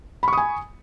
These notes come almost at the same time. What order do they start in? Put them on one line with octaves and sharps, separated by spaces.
B5 C#6 D#6 G#5